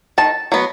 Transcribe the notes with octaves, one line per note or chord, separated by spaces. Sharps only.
D#3 A5
F#3 B3